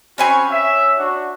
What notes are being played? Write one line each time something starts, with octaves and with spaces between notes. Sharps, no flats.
C4 C#4 F#4 C#5 G#5 B5
E5
D4 F#4